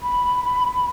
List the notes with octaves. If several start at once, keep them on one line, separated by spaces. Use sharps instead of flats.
B5